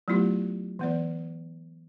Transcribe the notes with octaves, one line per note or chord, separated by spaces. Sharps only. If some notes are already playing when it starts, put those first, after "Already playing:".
F#3 A3 B3 E4 F4 G4
E3 B3 D5